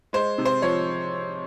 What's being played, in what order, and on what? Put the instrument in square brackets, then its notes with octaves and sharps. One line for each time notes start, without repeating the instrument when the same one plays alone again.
[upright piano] G#3 C5
C3
C5
F3 C#5